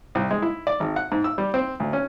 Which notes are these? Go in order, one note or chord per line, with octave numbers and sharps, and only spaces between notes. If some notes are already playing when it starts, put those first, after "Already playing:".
C2
G#3
E4
D5
G#1
F#5
G#2
E6
G3
C4
D2
C#4